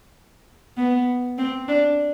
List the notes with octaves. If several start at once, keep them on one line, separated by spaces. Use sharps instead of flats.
B3
C4
D4